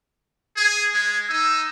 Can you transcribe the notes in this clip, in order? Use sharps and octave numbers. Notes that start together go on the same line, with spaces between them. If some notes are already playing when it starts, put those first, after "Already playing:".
G#4 G#6
G#3
D#4 E6